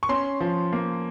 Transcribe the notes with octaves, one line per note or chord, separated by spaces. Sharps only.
C#6
C#4 C6
F3
A#3